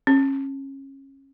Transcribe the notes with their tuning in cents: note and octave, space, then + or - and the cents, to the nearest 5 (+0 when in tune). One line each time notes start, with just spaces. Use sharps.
C#4 -25